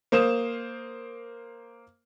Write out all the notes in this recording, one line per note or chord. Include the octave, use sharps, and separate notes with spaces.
A#3 C5 D#6 E7